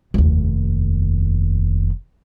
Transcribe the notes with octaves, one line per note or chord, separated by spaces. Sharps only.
F1 D#2